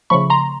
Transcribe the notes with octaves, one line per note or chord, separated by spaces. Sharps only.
C#3 F3 A3 B5 C#6
A#5 C6